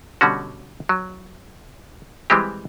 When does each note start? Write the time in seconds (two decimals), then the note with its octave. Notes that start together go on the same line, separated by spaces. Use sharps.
0.21 B2 D3 G3 C#4 F#4
0.89 F#3
2.30 E3 G3 G#3 C4 G4